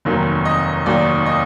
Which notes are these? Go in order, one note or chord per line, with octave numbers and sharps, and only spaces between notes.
F1 D#2 D#3 F#3
D#5
F1 D#2 D#3 F#3 D5
D#5